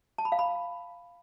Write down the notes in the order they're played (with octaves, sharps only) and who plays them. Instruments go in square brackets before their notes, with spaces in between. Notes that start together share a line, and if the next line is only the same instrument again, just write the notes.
[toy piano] A5
B5
F5
B5